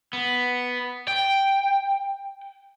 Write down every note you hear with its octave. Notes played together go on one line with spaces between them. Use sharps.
B3
G5